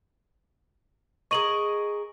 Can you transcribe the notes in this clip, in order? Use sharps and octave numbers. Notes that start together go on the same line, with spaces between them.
G#4 A#4 D#5 C#6 D#7 F#7